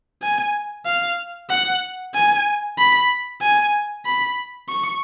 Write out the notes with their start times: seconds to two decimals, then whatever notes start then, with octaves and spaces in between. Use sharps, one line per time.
0.22 G#5
0.86 F5
1.50 F#5
2.14 G#5
2.78 B5
3.41 G#5
4.06 B5
4.69 C#6